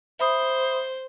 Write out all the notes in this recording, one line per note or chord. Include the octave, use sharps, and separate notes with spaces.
C5 E5 B5 D#6